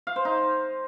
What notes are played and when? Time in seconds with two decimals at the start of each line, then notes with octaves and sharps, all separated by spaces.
0.07 F5
0.16 C5
0.25 D#4